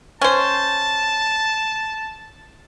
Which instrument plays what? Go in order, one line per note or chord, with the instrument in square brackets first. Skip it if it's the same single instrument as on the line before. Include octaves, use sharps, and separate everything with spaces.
[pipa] C#4 C5 [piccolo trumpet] A5